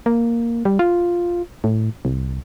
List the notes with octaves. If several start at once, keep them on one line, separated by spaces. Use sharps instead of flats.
A#3
G3
F4
A2
C2